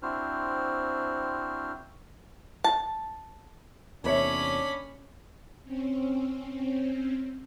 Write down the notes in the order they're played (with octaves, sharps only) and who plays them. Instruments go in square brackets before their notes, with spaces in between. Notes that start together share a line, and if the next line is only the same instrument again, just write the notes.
[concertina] C4 D4 E4 F#4 C5 F6
[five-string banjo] A5
[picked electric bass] E2 C3 [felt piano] A#3 C#5 E5 [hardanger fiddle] C#4 B5 [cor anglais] D4
[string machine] C4 C#4